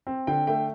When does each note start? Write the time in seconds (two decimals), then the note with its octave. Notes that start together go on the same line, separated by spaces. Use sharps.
0.07 C4
0.27 D3 G5
0.47 A3 G5